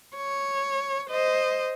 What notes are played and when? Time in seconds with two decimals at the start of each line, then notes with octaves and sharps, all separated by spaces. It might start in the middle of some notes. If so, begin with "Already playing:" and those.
0.17 C#5
1.10 C5 D#5